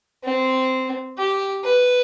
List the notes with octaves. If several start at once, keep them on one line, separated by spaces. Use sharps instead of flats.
C4
G4
B4